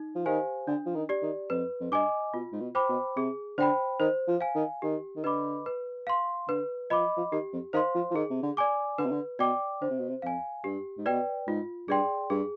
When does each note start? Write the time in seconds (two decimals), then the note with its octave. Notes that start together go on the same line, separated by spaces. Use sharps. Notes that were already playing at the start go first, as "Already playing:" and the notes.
Already playing: D#4
0.15 F3
0.26 D#3 G4 C5 F5 G#5
0.67 D3 D4
0.86 F3
0.95 D#3
1.09 G4 D5
1.22 D#3
1.50 F2 B4
1.80 F2
1.91 G2 D#5 G#5 D6
2.34 B2 F4
2.53 G#2
2.61 B2
2.75 C5 G5 B5 D6
2.89 B2
3.16 C3 G#4
3.58 D3 C5 G5 B5
4.00 D#3 C5
4.28 F3
4.41 F5 G#5
4.55 D#3
4.82 D#3 G4
5.16 D#3
5.24 D3 B4 D#5 B5 D6
5.66 B4
6.07 F5 C6
6.48 D3 B4
6.90 F3 D#5 B5 D6
7.17 F3
7.32 D#3 G4
7.53 F2
7.73 D#3 C5 F5 C6
7.95 F3
8.11 F3
8.15 D#3 G#4
8.30 C3
8.43 D3
8.57 D5 G#5 D6
8.98 D3 B4
9.05 C3
9.12 D3
9.39 B2 D5 G5 D6
9.82 D3 C5
9.90 C3
9.99 B2
10.09 C3
10.22 F2 F5 G#5
10.64 G2 G4
10.98 G#2
11.06 B2 B4 D5 G5
11.47 G#2 F4
11.88 G2 G#4 D5 G5 C6
12.30 G2 G#4